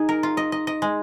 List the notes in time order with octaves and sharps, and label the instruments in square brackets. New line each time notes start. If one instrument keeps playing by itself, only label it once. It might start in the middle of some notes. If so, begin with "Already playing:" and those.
Already playing: [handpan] D#4 [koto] G#4
[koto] A#4
F4
D#5
D#5
D#5
G#3